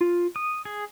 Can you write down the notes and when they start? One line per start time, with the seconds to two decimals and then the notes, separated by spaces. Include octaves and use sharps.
0.01 F4
0.36 D#6
0.65 G#4